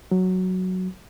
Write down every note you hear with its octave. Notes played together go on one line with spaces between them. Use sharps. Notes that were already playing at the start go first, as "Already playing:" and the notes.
F#3